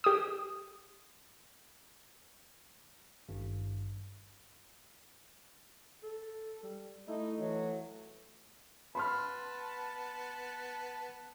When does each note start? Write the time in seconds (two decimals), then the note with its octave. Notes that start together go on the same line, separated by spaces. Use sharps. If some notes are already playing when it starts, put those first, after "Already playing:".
0.04 G4 D#6
3.29 G#1 G2
6.03 A4
6.63 G3
7.08 A3 D#4 E4
7.39 E3 F#3
8.95 B3 A5 B5 C6 F6